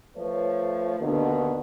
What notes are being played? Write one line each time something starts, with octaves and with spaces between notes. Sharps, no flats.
F3 A3 B4 C#5
D#2 B2 D3